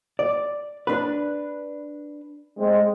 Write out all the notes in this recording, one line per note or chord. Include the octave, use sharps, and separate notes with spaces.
D5
D4 B4
G#3 C4